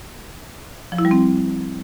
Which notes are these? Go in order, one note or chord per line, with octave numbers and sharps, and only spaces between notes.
F3
E4
G3
C4